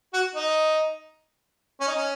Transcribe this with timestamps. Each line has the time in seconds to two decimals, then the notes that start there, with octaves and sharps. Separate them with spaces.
0.14 F#4
0.35 D#4
1.80 C#4
1.88 D#4
1.96 C#4